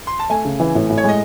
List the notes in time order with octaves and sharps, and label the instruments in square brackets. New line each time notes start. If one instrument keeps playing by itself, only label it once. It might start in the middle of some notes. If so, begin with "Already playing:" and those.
[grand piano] C6
A5
[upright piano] A3 [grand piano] G#5
[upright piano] C#3
E3
A2
A2
[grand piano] C#5
[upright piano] G#3 [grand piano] D#5